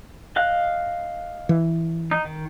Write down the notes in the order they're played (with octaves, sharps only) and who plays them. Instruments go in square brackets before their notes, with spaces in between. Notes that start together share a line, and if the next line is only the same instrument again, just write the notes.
[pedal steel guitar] D#5 F5 F#6
[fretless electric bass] E3
[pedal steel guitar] D#4
D#3